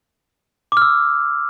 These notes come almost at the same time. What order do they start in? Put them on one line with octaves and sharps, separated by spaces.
D6 F6 E6